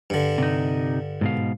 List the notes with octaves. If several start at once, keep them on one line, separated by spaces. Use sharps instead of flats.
G2 D3
C3 D#4
G#2 B2 F5